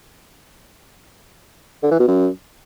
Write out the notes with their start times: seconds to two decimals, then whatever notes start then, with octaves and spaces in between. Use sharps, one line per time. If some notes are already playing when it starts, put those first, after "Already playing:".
1.83 D3
1.91 E3
1.99 B2
2.07 F#2